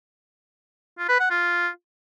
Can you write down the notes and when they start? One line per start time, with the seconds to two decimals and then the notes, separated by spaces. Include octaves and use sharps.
0.98 F4
1.09 B4
1.20 F#5
1.30 F4